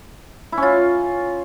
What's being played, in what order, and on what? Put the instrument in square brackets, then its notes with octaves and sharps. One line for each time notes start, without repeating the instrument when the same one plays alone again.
[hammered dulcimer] E4
C#4
F4